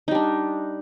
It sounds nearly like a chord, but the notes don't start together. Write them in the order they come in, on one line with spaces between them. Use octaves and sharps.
D#4 G3 D4